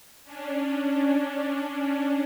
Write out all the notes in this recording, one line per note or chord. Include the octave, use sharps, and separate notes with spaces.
C#4 D4